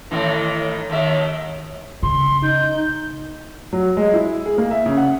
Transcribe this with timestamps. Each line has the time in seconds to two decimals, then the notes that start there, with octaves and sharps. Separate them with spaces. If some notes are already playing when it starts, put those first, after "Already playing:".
0.11 A2 D#3 E3
0.90 D#2 D#3 E5
2.03 C#3 C6
2.43 D#4 G6
3.73 F#3
3.97 G#3
4.14 E4
4.46 G#4
4.58 A#3
4.71 E5
4.86 C#3
4.97 F#5